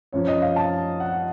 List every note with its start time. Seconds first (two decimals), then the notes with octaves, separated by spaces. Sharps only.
0.12 F#2 F3 C#5
0.28 D#5
0.42 F5
0.56 A5
1.00 F#5